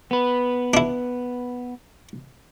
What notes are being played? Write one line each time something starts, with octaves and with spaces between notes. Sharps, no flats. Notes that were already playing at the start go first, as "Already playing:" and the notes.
B3 B4
D4 E4